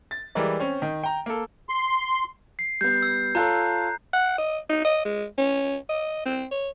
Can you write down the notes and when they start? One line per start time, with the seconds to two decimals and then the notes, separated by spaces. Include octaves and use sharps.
0.11 A6
0.35 E3 G3 G#3 A#4 D5
0.59 C4 C#4
0.82 D#3
1.04 G5 A#5
1.26 A#3 A4
1.69 C6
2.59 C7
2.81 G3 B3 G6 C7
3.02 E6
3.35 F4 A4 C#5 A#5 F#6
4.13 F#5
4.38 D#5
4.69 D#4
4.85 D#5
5.05 G#3
5.38 C#4
5.89 D#5
6.25 C4
6.51 C#5